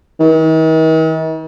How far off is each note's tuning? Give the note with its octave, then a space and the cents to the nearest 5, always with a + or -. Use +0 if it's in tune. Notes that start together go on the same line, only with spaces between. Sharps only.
D#3 +45